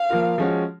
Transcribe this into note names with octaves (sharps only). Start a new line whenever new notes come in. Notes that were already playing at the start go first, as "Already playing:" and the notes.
Already playing: F5
F3 A#3 F4 A#4
F3 G#3 C#4 F#4